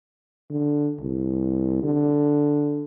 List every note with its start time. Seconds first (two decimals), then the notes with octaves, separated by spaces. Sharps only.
0.50 D3
1.01 C2
1.83 D3